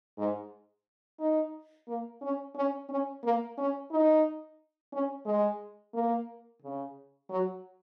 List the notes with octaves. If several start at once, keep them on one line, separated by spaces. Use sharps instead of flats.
G#2
D#4
A#3
C#4
C#4
C#4
A#3
C#4
D#4
C#4
G#3
A#3
C#3
F#3